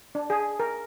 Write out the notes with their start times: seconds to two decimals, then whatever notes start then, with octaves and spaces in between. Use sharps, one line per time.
0.15 D4
0.30 G#4
0.60 A#4